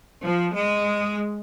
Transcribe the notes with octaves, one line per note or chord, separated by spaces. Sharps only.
F3
G#3